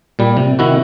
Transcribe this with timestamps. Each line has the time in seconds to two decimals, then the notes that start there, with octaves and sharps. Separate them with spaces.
0.19 A#2 G3
0.37 C3
0.59 C3 D#3 E4 F#4